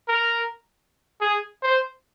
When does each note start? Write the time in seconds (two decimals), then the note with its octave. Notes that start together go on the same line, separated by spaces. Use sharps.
0.08 A#4
1.21 G#4
1.62 C5